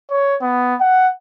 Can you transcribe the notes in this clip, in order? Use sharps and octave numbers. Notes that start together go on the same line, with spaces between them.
C#5
B3
F#5